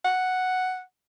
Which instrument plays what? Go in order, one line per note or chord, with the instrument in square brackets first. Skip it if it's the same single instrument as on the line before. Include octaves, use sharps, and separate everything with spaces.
[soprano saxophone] F#5